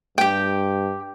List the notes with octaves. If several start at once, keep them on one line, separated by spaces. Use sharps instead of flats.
G2 G4 G5